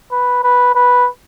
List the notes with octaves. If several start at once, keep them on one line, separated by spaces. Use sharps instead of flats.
B4
B4
B4